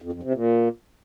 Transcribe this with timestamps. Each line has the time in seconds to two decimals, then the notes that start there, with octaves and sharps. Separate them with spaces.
0.02 F2
0.12 F2
0.23 C3
0.33 A#2